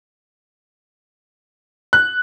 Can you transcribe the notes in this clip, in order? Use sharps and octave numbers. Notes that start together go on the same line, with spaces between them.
F#6